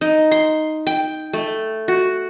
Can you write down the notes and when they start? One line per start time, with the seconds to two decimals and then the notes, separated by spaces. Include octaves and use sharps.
0.01 D#4
0.31 C6
0.87 G5
1.33 A3
1.88 F#4